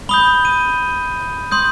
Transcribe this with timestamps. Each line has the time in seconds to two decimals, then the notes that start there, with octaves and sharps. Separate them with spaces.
0.09 B5 D#6 G6 G7
0.45 D#7
1.52 C6 D#6 G6